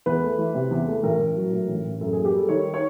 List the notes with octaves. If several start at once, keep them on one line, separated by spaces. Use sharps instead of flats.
E2 B4
A3
E3
C3
E2
A3
A1 A#4
A1
F#3
A2
A1
A1
F#2 A4
A#3 G#4
G4
G3 A4
D#3 C#5
C#5